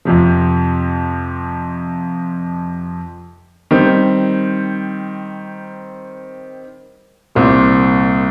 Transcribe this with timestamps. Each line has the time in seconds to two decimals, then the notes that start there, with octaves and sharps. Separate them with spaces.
0.05 F2 C3 F3
3.71 D#3 G3 C4
7.35 C2 A#2 G3 C4